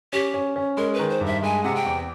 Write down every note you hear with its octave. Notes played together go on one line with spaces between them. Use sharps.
C#4 G4
C#4
C#4
G#3 A#4
B4
D#3
C5
G2
E5
G#3 G#5
C3 F#5
G5
E2